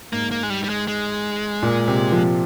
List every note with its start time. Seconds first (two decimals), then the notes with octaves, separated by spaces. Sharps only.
0.13 G#2 A#3
0.31 A#3
0.43 G#3
0.50 G3
0.64 G3
0.70 G#3
0.88 G#3
1.62 A#2
1.88 C3
2.12 F3